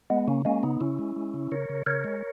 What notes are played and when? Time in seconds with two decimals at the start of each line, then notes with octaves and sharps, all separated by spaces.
0.10 G#3 B3
0.28 C#3 A#3 C#4
0.45 G#3 A#3 C#4
0.63 C#3 B3 D#4
0.80 C#3 C#4 E4
0.99 G#3
1.16 G#3
1.34 C#3
1.51 C#3 A#4 C#5
1.69 C#3
1.86 C#3 A#4 C#5
2.04 G#3